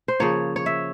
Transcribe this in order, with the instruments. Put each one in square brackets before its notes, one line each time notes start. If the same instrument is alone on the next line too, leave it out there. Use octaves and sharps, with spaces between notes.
[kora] C5
C#3 F3 A#3 C#5
C#5
E5